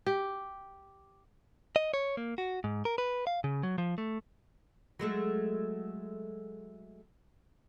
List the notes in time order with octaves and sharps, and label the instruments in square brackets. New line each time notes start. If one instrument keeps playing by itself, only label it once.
[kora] G4
[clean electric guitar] D#5
C#5
A#3
F#4
G#2
A#4
B4
F5
C#3
F#3
F3
A3
[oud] F#3 G#3 A3